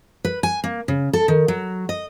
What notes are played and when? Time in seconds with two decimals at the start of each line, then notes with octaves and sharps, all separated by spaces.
0.25 B4
0.43 G#5
0.64 A#3
0.88 C#3
1.13 A4
1.28 D#3
1.48 F#3
1.89 D#5